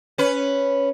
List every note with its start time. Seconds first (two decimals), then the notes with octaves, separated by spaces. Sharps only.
0.18 C#4 B4